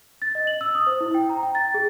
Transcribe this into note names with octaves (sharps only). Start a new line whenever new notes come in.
A6
D#5
F#7
E6
D#6
C5
E4
G5
A#5
G5
A6
G#4